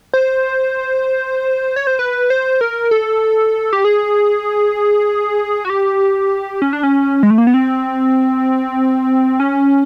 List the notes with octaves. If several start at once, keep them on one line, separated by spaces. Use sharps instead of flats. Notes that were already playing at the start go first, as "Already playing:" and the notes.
C5
C#5
C5
B4
C5
A#4
A4
G4
G#4
F#4
G4
C#4
D4
C#4
G#3
A3
A#3
B3
C4
C#4